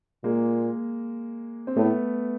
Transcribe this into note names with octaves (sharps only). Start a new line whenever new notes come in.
A#2 G#3 A#3
C4
A2 A3 B3